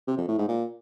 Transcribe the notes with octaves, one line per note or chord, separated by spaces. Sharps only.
C3
F2
A2
G#2
A#2